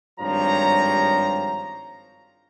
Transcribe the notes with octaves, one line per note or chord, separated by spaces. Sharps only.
G#1 G2 F3 G4 C#5 A#5